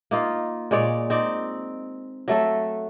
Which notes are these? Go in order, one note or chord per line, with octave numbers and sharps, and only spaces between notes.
A#3 D#4 F4
A#2 G#3 C#5 D5
C4 D#4 D5
F#3 A3 A4 E5